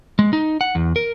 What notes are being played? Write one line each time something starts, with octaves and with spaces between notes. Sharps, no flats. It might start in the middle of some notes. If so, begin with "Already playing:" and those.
G#3
D#4
F#5
E2
A#4